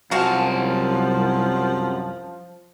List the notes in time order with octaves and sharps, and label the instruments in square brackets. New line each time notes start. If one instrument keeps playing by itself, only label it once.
[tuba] C2 [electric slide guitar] F#2 A5 [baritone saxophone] F3 [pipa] G#3 F#4 F5